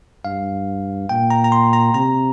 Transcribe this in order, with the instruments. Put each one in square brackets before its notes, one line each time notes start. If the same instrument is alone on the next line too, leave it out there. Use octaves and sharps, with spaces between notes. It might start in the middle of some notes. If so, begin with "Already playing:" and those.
[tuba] G2 [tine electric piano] F5
[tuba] A#2 [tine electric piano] G5
[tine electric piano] A#5
A#5
C6
A#5
[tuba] C3 [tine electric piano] A#5